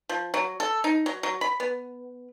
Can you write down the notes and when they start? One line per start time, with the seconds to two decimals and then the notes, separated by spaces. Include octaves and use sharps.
0.09 F3
0.34 F#3
0.60 A4
0.84 D#4
1.06 F#3
1.23 F#3
1.41 B5
1.60 B3